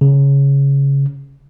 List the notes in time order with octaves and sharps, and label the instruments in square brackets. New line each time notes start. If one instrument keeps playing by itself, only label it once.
[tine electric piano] C#3